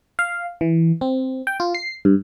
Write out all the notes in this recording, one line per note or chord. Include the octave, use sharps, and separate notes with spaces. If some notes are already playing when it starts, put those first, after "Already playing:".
F5
E3
C4
G5
F4
C7
G2